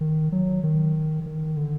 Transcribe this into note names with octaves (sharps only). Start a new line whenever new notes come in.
D#3
F#3
D#3
D#3
D3